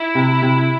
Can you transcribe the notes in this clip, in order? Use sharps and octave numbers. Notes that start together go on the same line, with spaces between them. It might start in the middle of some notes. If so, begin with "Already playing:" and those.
Already playing: E4
C3
C3